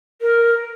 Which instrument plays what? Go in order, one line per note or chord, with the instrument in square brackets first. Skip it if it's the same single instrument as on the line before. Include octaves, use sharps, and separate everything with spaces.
[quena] A#4